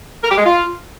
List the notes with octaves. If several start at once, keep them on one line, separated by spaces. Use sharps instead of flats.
A#4
G4
G#3
F4